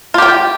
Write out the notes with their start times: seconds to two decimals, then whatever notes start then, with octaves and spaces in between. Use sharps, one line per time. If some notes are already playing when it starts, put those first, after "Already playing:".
0.14 F4
0.18 G4
0.22 G5